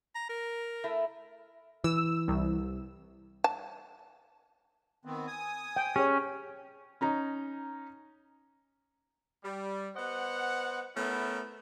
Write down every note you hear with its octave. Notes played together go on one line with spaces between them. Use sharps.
A#5
A#4
A3 E4
E3 E6
C2
A5
D#3 B3 C4
G#5 D#6
G5
C#4 G4 G#4 C#5
C#4 D#4 A#5
G3
B3 C5 D#5 F#5
A3 B3 C#4 E4 A#4